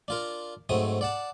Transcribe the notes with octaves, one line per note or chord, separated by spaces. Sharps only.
D4 F4 A#4
G#2 F#3 A3 C4 D#6
D5 F#5 A5